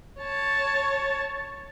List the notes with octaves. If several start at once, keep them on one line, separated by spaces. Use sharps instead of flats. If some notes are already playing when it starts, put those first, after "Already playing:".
C#5 A5